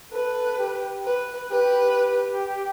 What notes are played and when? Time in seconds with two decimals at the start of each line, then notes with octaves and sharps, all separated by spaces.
0.12 A4 B4
0.58 G4
1.05 B4
1.51 G4 B4